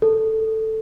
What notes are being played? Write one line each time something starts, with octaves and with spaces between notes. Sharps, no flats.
A4